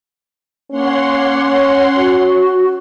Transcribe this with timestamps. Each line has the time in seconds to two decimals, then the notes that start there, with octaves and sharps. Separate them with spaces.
0.71 A#3 C#4 C#5 F#5 C6
1.96 F#4